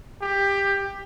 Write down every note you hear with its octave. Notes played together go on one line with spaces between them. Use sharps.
G4